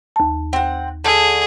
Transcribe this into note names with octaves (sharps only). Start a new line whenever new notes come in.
D#2 A5
C4 F#5
D3 A3 G#4